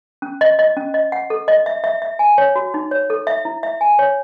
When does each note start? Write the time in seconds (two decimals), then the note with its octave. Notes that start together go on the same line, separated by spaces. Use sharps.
0.22 C#4
0.41 D#5
0.59 D#5
0.77 C#4
0.94 D#5
1.12 F#5
1.30 A4
1.48 D#5
1.66 E5
1.84 E5
2.02 E5
2.19 G#5
2.38 C#5
2.56 F#4
2.74 D#4
2.91 C#5
3.10 A4
3.27 E5
3.45 E4
3.63 E5
3.81 G#5
3.99 C#5